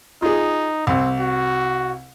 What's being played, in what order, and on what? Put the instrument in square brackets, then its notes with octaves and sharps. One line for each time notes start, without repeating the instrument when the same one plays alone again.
[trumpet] D#4 [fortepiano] F4 G#4
[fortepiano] C2 [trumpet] C4
[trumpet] F#4